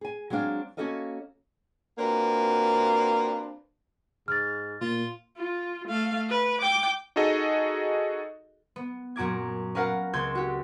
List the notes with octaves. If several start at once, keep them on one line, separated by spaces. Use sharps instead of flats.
G#4 G#5
F#3 G#3 C4 D4 F5
A#3 C#4 F#4 A4 D#5 F5
A#3 C4 D4 F4 F#4 B4
G#2 F6 A6
A#2 F4
F4
A3 F5
B4
G5 D6
D#4 F#4 G#4 A4 D#5
B3
F#2 A#2 F#4 A#5 D6 G#6
C#4 A#4 B4 F5 F#5 A#5
C#2 C4 G6 G#6
F#4 G4